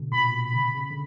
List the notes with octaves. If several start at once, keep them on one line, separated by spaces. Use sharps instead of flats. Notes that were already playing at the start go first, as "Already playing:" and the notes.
Already playing: B2 D3
A#2 B5
B2
C#3 B5
C#3
D3